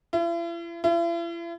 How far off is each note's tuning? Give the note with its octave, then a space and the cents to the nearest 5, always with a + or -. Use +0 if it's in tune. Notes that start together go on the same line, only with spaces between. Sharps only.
E4 +45
E4 +45